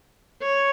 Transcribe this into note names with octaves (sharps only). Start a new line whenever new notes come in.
C#5